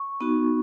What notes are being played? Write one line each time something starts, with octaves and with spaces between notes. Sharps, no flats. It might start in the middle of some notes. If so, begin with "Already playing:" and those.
Already playing: C#6
B3 D#4 F#4